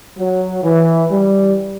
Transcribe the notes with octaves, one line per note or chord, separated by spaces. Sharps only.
F#3
E3
G3